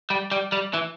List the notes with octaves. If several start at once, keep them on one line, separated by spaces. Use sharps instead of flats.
G3
G3
G3
E3